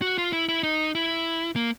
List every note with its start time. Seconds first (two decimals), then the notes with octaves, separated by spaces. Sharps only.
0.02 F#4
0.18 F4
0.33 E4
0.49 E4
0.63 D#4
0.95 E4
1.56 A#3